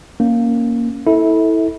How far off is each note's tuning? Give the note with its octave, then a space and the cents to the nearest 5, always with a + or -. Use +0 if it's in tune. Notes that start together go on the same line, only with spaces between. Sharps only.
A#3 +0 C#4 +0
E4 -20 A4 +0 E5 -35